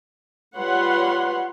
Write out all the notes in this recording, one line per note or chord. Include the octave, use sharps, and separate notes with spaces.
G3 F4 B4 C#5 F#5 C6